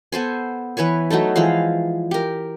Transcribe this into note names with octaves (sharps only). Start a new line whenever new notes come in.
B3 A4 C5 G#5
E3 B4 C#5 G#5
F#3 A3 D#4 A4
E3 F3 G#3 F5
G4 A#4